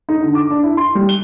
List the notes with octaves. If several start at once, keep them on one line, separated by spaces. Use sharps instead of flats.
D#4
D3
D6
D4
E4
C6
G3
G7